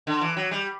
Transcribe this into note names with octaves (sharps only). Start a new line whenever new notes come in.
D3
E3
F#3
G3